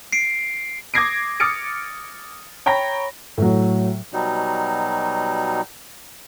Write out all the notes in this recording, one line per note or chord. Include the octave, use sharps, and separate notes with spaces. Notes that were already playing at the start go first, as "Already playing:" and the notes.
C7 D7
D6 D#6 G#6 A#6 C7 D7
D6 D#6 F6 A6 C#7 D7
C#5 G5 A#5 B5 A#6
A2 F#3
B2 F#3 G3 D#4